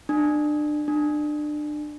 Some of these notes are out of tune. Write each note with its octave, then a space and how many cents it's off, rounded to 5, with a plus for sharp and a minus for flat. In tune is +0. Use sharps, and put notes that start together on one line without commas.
D4 +30
D4 +30